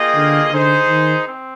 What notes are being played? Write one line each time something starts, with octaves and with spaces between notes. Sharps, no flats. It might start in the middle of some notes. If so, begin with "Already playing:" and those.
Already playing: A#3 F4 G#4 D#5 G5
D3
D3 D#4 G#4 C5
D#3
C4